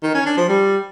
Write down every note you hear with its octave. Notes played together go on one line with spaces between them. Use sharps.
D#3
C#4
D4
F3
G3